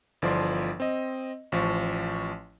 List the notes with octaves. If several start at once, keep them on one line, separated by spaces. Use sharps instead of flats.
G1 E3 F3 A4 D5 C6
C4 D#5
A1 F3 C#6